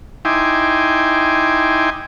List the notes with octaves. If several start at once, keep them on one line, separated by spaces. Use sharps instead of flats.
D#4 E4 G5 G#5 C6 D6